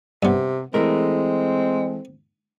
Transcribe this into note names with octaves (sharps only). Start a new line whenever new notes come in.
G2 C3 B3
E3 G#3 A3 C4 A#4